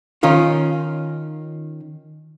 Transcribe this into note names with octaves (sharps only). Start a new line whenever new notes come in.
D#3 C#4 D#4 F4